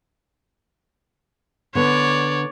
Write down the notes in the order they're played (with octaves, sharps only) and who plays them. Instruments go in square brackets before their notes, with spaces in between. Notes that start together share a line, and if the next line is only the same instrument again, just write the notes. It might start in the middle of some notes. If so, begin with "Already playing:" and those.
[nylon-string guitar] D3 B3 [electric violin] C#5 D5